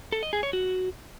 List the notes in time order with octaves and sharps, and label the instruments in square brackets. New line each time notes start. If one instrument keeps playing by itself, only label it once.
[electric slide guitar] A4
D#5
G#4
C#5
F#4